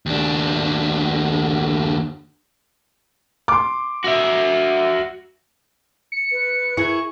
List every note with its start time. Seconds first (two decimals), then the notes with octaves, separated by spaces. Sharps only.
0.06 D#2 D4
3.48 C6 D6
4.04 F#4 E5
6.12 C#7
6.32 B4
6.77 E4 G#4 A#4 C#6